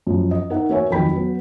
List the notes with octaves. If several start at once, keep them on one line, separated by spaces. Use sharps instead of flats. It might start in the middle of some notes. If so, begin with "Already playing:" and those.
F#2 F3
D#5
D#4 A#4 E5 F#5
A#3 F#4 B4 C#5 E5 G#5
F2 D#3 F#3 G5 B5 B6
F#3 B3